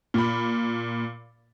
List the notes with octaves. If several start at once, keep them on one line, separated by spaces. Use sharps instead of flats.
A#2 B5